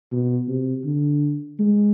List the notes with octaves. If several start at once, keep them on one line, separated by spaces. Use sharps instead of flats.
B2
C3
D3
G#3